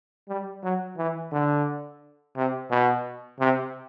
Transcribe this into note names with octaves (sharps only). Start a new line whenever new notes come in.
G3
F#3
E3
D3
C3
B2
C3